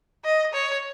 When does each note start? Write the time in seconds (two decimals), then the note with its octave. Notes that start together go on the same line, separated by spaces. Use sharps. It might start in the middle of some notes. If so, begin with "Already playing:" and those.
0.25 D#5
0.54 C#5